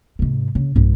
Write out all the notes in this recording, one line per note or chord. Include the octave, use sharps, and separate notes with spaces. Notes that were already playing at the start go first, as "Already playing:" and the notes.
G#2 C3
C#3
B1 G2